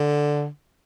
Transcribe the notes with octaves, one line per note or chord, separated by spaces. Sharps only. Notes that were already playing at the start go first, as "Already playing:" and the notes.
Already playing: D3